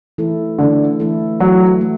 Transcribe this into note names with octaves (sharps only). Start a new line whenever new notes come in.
E3 A3 E4 A4
D3 E3 A3 E4 A4
E3 A3 E4 A4
E3 F#3 A3 E4 A4
A3